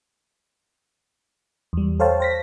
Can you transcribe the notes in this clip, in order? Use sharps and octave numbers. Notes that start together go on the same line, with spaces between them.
E2 G3
A4 C5 C#5 F5 G5 A5
C5 A#6 B6